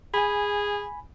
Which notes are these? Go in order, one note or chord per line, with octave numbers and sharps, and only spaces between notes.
G#4 G#5 B5